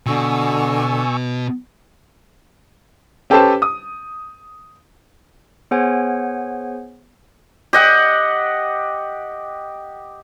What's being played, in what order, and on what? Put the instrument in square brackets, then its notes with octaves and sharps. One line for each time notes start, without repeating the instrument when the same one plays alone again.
[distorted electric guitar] B2 [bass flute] D3 [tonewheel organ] G#5 C#6 E6
[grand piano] C#4 G4 A4 B4 C5 A5
D#6
[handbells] B3 G#4 C5 C#5 F#5 G#5
[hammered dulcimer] G4 D#5 F#5